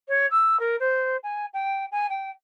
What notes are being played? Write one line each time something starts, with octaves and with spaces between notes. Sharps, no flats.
C#5
E6
A#4
C5
G#5
G5
G#5
G5